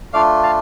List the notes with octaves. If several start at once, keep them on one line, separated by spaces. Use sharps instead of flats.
A3 D4 F4 D5 F5
F5 A5